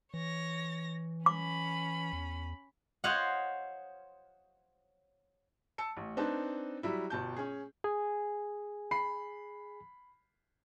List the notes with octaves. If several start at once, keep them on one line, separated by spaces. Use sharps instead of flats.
E3 C#5 A#6
C#4 B5 D6
E2
C5 C#5 D#5 F5 F#5
A5 E6 C#7
A1
C4 D4 D#4 B4 A5
F#3 G3 E4
G1 B2 A5 G6
C#4 G#4
G#4 G#5
B5 C7